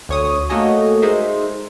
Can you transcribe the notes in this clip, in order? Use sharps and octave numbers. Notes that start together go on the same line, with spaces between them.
D2 C#5 D#6
A3 A#3 F#4 C#5 D#5 G#5
G#3 D#4 C5 E5